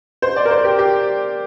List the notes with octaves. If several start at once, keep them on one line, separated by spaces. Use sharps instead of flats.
C5
D5
A#4
C5
G4
G4